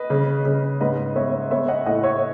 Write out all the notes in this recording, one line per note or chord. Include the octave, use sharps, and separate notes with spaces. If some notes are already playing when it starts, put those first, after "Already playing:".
Already playing: B4 D#5
C#3
C#3
G#2 B4 D#5
B3 C#5 E5
B3 C#5 E5
D#5 F#5
A2 D#5 F#5
C#5 E5